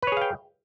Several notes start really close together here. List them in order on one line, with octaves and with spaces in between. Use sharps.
B4 C#5 G#4 F5 G5